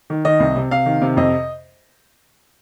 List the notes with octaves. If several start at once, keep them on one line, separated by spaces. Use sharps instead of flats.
D#3
D#3 D#5
C2
C3
C3 F5
D#3
C3
F2 D#5